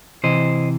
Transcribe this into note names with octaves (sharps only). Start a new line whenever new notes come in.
C3 E3 C5 D#5